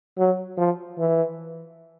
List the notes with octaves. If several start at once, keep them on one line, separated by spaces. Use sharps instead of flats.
F#3
F3
E3